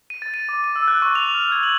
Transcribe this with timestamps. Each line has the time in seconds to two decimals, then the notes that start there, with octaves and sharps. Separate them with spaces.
0.10 D#7
0.22 A6
0.34 D#7
0.49 D6
0.64 D#7
0.76 E6
0.88 F#6
1.02 C#6
1.15 F7
1.34 F6
1.52 G#6
1.63 F#7